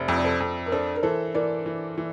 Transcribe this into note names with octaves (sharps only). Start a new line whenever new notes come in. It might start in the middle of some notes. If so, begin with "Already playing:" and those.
Already playing: F1 C5 D5 E5
F2
D5
A4 C5
F2
A#4
D4 A4 C5
A#4
E3 A4 C5
E3 A#4 D5
E3
E3